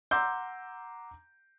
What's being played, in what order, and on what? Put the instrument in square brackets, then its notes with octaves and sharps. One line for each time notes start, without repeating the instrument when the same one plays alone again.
[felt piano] F#5 A#5 C6 D6 E6 G6